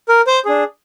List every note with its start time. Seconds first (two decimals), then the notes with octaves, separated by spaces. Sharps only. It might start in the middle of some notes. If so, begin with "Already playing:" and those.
0.09 A#4
0.27 C5
0.45 D4 G#4